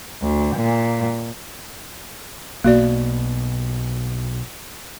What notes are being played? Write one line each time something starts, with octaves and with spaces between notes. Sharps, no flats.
D2
A#2
B1 B2 A#3 F#4 D5